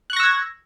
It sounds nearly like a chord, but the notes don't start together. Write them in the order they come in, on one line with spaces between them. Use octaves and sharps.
F#6 C#6 A#6 E6 G#6